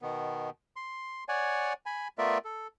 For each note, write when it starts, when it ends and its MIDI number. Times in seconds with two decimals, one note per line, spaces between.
0.02 0.50 47
0.02 0.50 51
0.02 0.50 59
0.76 1.24 84
1.29 1.73 73
1.29 1.73 74
1.29 1.73 78
1.29 1.73 80
1.86 2.08 80
1.86 2.08 83
2.18 2.38 57
2.18 2.38 59
2.18 2.38 65
2.18 2.38 70
2.18 2.38 74
2.18 2.38 76
2.45 2.67 69